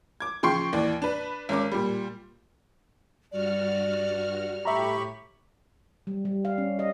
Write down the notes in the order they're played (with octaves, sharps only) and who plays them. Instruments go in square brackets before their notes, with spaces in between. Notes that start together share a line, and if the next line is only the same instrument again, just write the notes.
[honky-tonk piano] D6 G#6
C#3 F3 G5 C6 C#6 C7
D#2 E3 D5
D4 B4
G#1 C#4 A#4 D6
A#2 G3
[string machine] G2 F#4 F6 [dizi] D5
[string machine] A2 [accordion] G4 B5 C#6 [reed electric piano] E5 A#5
[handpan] G3
G3
F5
C#4
D#5